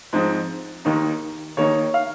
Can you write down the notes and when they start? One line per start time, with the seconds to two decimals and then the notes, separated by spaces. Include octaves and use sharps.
0.13 G#2 F3 G#3 C4 D#4
0.85 D#2 D#3 A#3 D#4
1.57 D#2 D#3 A#3 D#4 C#5
1.94 F5